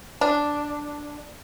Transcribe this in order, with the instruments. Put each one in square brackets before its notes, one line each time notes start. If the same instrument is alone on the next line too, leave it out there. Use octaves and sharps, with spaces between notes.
[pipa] D4